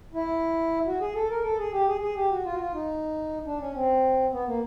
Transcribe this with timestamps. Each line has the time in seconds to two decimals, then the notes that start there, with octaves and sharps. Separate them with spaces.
0.14 E4
0.87 F#4
1.01 G#4
1.15 A4
1.30 A#4
1.44 A4
1.58 G#4
1.73 G4
1.87 G#4
2.01 G#4
2.16 G4
2.31 F#4
2.45 F4
2.52 F#4
2.59 F4
2.74 D#4
3.46 D4
3.60 C#4
3.74 C4
4.32 B3
4.46 A#3